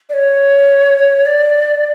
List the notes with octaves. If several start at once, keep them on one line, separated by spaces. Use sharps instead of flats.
D5
C#5
D5